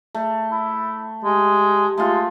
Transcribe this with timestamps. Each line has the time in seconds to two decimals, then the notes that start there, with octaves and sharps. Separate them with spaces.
0.15 A3
0.52 E4
1.24 G#3 G4
1.97 G#3 A3 F4